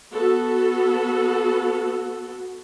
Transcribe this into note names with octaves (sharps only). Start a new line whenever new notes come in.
B3 F#4 A4